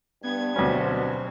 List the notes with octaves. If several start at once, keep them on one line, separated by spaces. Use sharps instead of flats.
G2 B3 G#6
D2 B2 F#3 C4 C#4